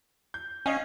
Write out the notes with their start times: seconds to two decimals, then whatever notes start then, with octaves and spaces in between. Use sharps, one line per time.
0.34 G6
0.66 C#4 D#5 F5 G#5